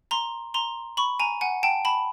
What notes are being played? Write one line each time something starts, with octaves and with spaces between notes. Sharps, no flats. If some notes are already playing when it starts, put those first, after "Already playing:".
A#5 C6
A#5 C6
B5 C#6
G#5 A#5
F#5 G#5
G5 A5
A5 B5